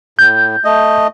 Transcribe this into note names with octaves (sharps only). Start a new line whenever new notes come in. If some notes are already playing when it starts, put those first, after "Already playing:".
A2 G6
A3 D#5